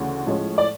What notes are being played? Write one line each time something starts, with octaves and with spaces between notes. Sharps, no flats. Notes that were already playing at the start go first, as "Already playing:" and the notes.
Already playing: D2 C#3 E3
A2 F3 G#3 C#4
D5